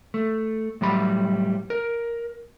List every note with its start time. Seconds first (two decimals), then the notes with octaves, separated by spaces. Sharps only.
0.14 A3
0.81 A2 F#3 G3 B5
1.70 A#4